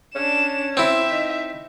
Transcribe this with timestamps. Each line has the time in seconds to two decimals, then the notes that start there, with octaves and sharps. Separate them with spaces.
0.15 C#4 D4 E7
0.77 C4 E4 E5
1.11 D#4